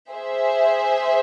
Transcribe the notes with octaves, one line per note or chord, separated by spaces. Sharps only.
G#4 C5 E5